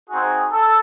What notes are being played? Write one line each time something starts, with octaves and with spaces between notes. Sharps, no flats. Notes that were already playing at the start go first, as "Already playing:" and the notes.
C4 D#4 F#4 G#4
A4